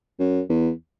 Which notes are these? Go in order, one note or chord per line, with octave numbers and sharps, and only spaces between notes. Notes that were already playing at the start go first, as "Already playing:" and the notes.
F#2
E2